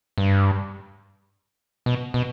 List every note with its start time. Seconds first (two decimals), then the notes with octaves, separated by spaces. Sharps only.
0.18 G2
1.86 B2
2.14 B2